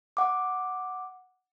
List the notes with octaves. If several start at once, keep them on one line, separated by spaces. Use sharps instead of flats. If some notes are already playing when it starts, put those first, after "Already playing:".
F#5 D6